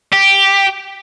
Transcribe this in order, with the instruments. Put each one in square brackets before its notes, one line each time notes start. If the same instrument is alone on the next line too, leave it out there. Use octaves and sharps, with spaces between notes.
[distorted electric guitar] G4